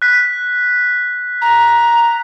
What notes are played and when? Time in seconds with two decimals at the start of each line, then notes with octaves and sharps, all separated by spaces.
0.02 F#6 B6
1.42 A#5